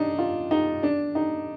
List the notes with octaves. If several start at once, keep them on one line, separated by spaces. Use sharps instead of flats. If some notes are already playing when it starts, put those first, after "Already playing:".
Already playing: D4 D#4
F4
D#4
D4
D#4